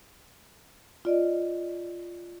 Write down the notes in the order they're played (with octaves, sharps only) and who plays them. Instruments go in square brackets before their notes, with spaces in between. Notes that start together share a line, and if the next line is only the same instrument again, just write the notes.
[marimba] F4 D5 D#5